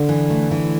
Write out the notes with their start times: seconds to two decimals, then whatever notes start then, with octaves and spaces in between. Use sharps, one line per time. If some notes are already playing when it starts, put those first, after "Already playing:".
Already playing: D3
0.09 E3
0.30 A3
0.51 E3